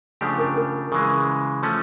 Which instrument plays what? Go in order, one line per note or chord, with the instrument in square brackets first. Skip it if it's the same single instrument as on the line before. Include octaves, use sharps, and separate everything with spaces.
[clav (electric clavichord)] C#3 F3 A3 D4 G4
[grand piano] A#4
A#4
[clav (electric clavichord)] C#3 E3 G#3
F3 A3 C#4